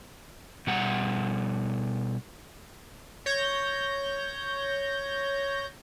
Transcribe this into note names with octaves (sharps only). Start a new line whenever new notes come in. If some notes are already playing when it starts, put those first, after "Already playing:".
B2 G3 F#5 A#5
C#5 G6 A#6